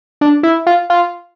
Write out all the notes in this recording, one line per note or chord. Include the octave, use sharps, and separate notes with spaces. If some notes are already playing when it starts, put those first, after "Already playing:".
D4
E4
F4
F4